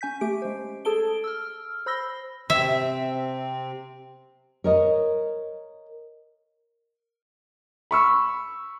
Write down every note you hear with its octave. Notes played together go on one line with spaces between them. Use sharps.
C#4 G#5 G6 B6
A3 G4 D7
G#3 C5
G#4 A4 A5 D7 G7
E6 F6
C5 B5 E6 A#6 G7
C3 C4 E5
A#4 C#5 D#5
B5 C#6 E6